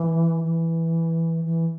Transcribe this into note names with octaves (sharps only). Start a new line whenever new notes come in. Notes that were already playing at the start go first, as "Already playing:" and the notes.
Already playing: E3
E3
E3